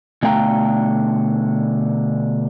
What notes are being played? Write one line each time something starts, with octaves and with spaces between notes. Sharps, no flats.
B2 D3 A3 F5 G5 A#5